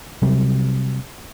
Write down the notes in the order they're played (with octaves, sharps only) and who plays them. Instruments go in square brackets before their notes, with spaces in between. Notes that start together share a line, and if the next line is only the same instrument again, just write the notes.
[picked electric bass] C3 F#3 G3